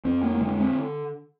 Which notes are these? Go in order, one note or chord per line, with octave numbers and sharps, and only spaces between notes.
F2 C4
A#3
A#3
D3 G#3
C4